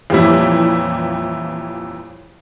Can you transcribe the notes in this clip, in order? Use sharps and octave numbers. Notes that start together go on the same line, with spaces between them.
F2 A#2 E3 G3 C#4 E4